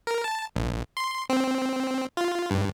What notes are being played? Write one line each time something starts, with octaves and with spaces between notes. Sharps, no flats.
A#4
A5
A#1
C6
C4
F4
G2